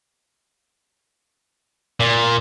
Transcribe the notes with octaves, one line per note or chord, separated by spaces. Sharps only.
A#2